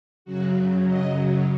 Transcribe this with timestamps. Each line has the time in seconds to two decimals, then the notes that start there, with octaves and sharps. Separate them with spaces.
0.25 F#2 C#3 F#3 F#4
0.87 D#5